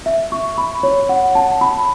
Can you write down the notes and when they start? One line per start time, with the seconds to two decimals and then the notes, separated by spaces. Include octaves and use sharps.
0.06 E5
0.32 C#6
0.58 B5
0.83 C#5
1.09 F#5
1.35 A5
1.61 B5